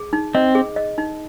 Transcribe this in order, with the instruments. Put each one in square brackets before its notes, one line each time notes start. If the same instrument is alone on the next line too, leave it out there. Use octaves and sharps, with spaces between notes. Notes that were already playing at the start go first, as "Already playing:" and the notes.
Already playing: [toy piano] G#4
D#4
[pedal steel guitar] C4 [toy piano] D#5
[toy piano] G#4
D#5
D#4